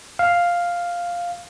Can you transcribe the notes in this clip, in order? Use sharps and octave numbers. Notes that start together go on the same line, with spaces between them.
F5